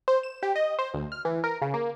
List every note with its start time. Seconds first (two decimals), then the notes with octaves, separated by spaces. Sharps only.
0.08 C5
0.23 E7
0.43 G4
0.56 D#5
0.79 C5
0.94 D2
1.12 F6
1.25 E3
1.44 A#4
1.62 C#3
1.74 A#3